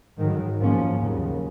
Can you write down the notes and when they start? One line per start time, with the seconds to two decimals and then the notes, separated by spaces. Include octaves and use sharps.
0.18 G#2 D#3 F#3
0.59 G#2 F3 A#3 C#4
1.00 D#2 C#3 F#3